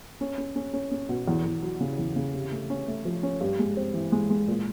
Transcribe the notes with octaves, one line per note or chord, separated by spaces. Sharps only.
C#4
C#4
C#4
C#4
C#4
B2
E2
E2
F#3
C#3
E2
C#3
C3
A3
C#4
A3
F3
C#4
G2
G#3
C4
E3
G#3
G#3
A#2